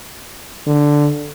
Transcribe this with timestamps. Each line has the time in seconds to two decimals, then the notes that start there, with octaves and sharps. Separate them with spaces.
0.67 D3